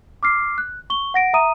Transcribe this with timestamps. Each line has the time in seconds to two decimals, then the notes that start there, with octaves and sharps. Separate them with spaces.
0.23 D6 F6 C7
0.58 F#6
0.90 C#6 G7
1.14 F#5 A#6 D7
1.34 E5 A#5 D#6 D#7